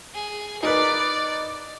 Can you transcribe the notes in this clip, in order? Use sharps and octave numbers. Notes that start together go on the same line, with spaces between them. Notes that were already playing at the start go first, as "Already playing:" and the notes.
G#4
D#4 A#4 B4 D5